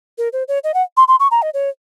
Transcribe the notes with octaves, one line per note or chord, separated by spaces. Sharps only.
A#4
C5
C#5
D#5
F#5
C6
C6
C#6
A#5
D#5
C#5